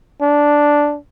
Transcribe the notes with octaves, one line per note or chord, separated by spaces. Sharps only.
D4